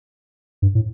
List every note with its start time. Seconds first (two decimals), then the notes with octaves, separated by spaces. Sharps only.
0.62 G2
0.75 A2